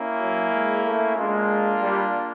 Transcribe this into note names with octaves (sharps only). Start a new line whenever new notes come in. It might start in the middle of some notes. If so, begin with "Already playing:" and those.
Already playing: A#3 C#4 E4
F#3
G#3
A3
G#3 A#3 D4 F4
G3